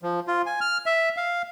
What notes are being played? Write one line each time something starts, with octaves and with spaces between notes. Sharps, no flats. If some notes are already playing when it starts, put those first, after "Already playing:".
F3
F4
G#5
F6
E5
F5